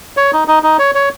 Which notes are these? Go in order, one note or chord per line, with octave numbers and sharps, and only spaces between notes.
C#5
D#4
D#4
D#4
C#5
C#5